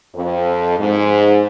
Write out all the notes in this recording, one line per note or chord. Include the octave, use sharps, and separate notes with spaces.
F2
G#2